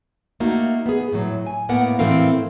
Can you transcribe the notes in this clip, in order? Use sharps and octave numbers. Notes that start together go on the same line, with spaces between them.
A3 A#3 D#4 F#4
B3 G#4
A2 F#3
G#5
A2 A#3 B3 A#4 F#5
A2 E3 C4 A4 A#4 F5